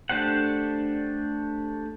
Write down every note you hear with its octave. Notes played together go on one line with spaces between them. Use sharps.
A3 D4 G4 C5 F#5